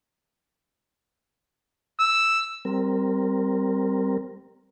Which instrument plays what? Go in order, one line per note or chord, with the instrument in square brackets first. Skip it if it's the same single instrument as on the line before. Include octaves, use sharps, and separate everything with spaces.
[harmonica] E6
[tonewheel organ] G3 C4 A#4